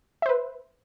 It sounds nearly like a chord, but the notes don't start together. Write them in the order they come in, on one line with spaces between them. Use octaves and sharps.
E5 C5 B4